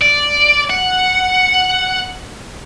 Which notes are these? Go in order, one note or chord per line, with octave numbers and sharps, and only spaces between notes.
D5
F#5